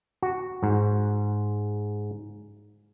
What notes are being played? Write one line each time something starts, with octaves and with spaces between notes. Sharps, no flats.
F#4
G#2